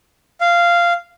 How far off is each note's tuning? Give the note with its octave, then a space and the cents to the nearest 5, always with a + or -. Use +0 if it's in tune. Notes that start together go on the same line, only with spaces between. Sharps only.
F5 -10